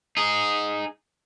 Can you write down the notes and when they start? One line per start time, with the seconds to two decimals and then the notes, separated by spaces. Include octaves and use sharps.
0.17 D#4 G#4